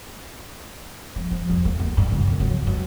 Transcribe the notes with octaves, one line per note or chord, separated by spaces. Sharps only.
F3
F3
F2
A3
D#2
G2
C#3
D#3
F#3
G2